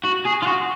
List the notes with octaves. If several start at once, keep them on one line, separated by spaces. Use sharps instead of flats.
F#4
G#4
F4
F#4